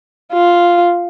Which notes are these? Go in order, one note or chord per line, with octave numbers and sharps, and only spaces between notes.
F4